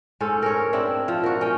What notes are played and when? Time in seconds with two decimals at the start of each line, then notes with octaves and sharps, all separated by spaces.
0.21 G#2 C#4 A4 C5
0.43 A#4 C#5
0.73 C4 D4 E4
1.08 F3
1.24 F#4 A#4
1.41 C#4 G5